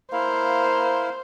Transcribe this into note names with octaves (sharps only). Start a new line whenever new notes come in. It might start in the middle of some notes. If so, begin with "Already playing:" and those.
A#3 E4 C5 F5